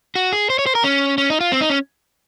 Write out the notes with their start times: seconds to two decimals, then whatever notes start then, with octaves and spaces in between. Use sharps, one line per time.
0.15 F#4
0.33 G#4
0.50 C5
0.59 C#5
0.67 C5
0.75 A#4
0.84 C#4
1.18 C#4
1.30 D#4
1.41 F4
1.52 C4
1.61 D#4
1.70 C#4